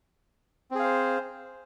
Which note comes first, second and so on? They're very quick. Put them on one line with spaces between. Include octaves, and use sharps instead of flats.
C4 G#4 F5 C5